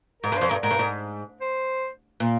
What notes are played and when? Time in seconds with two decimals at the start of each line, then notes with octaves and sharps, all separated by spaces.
0.22 G#2 A#4
0.32 G2
0.37 F2 C5
0.49 G2 A#4
0.63 G#2 A#4
0.71 G2
0.79 G#2
1.41 C5
2.20 A#2